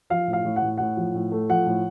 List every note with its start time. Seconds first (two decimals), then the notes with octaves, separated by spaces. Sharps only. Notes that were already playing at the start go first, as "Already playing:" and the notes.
0.10 F3 F5
0.28 A2
0.33 F5
0.45 A2
0.56 F#5
0.62 A2
0.78 A2 F#5
0.97 F3
1.14 A2
1.32 A3
1.49 F3 F#5
1.67 A2